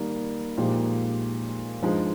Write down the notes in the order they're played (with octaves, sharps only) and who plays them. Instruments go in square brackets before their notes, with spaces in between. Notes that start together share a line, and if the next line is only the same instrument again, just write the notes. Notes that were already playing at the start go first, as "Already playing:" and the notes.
Already playing: [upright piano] D#3 G3 A#3 D#4
A#2 F3 G#3 D#4 G4
G2 F3 G#3 D#4